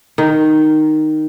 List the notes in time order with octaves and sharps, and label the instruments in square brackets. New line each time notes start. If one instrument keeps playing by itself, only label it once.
[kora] D#3